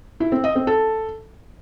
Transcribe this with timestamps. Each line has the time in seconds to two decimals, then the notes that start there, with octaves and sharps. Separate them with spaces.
0.20 E4
0.32 C4
0.44 D#5
0.55 C4
0.67 A4